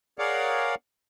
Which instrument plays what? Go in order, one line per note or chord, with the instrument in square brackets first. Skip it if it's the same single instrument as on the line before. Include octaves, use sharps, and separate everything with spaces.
[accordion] G#4 A#4 C#5 D5 F5 F#5